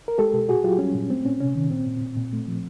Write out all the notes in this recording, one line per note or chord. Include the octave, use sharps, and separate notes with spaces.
A#4
G#3 G4 A4
B2
A#2 F#4 G#4
F#3 F4 G4
G3 C#4
A#2
A3 C4
A#2 C#4
C3 C#4
D#3
A#2 C4
A#2
A#2
A#2
A3
F3